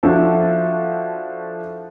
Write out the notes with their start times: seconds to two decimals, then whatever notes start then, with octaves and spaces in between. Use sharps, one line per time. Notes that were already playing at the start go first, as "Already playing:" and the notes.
0.03 F3 D4 E4 F#4 A4 C5